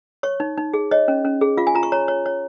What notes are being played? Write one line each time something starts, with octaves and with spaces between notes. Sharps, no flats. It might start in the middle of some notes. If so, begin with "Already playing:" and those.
C#5 C#6
D#4
D#4
G#4
C#5 D#5
C#4
C#4
G#4
F4 F5
G#5
F4 A#5
C#6
C#5 A#5
C#5
C#5